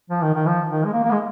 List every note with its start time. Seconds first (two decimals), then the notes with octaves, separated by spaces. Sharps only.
0.10 F3
0.22 D#3
0.34 D#3
0.47 F3
0.71 D#3
0.85 G#3
0.93 A#3
1.03 A#3
1.12 G#3